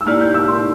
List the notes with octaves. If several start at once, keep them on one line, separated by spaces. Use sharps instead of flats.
E6
A#3 E4 G4 D5 F6
G6
E6
C6